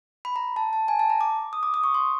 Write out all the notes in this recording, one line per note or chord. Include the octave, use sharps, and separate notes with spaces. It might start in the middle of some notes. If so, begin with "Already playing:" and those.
B5
A#5
A5
A5
G#5
A5
A#5
D6
D#6
D6
D#6
C#6
C6